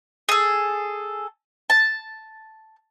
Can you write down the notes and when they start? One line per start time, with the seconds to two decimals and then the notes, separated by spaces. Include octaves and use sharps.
0.29 G#4 A4
1.70 A5